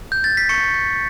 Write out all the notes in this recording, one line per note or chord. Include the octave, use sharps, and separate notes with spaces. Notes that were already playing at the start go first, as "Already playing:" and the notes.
G6
A6
B6
C#6 C#7
G6